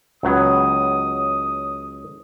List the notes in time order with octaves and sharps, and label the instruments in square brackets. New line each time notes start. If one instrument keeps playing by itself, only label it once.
[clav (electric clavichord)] C#2 F#3 B3 [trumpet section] D#6